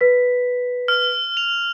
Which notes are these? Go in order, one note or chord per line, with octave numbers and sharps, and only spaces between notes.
B4 B6
F6
F7